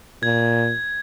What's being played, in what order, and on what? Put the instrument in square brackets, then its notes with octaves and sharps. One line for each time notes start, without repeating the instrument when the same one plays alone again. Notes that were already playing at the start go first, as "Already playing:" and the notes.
[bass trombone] A#2 [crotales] G#6